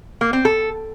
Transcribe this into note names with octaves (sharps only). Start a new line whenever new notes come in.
A#3
C4
A4